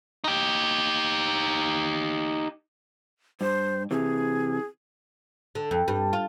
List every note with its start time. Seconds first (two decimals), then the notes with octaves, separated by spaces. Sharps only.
0.24 D#4 G4
3.41 G2 C5
3.91 C3 E3 G#4
5.55 D3
5.71 F2
5.88 G2
6.13 F4